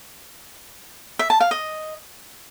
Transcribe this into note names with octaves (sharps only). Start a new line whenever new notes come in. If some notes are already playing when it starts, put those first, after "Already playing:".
E5
A5
F5
D#5